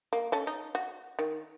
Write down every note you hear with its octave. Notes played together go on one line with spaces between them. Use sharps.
A#3
C#4 A4
D#4
F#4
D#3